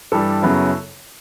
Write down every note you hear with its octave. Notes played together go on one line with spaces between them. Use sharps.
G2 E3 G3 A4
F#2 C#3 F#3 B3 E4